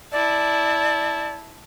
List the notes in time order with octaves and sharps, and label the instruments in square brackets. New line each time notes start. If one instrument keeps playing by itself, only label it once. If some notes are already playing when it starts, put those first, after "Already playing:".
[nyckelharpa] E4 A5 [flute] D5